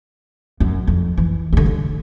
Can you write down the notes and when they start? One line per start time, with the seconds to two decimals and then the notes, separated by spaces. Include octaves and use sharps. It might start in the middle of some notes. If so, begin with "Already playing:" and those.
0.60 F#2
0.87 F2
1.17 E3
1.53 D3 G3
1.66 D3